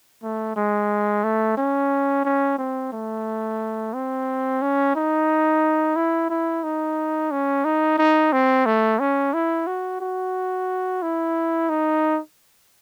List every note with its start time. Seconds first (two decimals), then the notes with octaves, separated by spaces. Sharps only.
0.23 A3
0.56 G#3
1.24 A3
1.57 C#4
2.25 C#4
2.58 C4
2.92 A3
3.94 C4
4.62 C#4
4.95 D#4
5.96 E4
6.30 E4
6.64 D#4
7.31 C#4
7.65 D#4
7.98 D#4
8.32 C4
8.66 A3
8.99 C#4
9.33 E4
9.67 F#4
10.01 F#4
11.02 E4
11.69 D#4